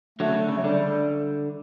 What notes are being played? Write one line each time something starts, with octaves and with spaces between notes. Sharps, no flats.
D3 F#3 A3
C#3
D3
C#3
F#3
D3 G3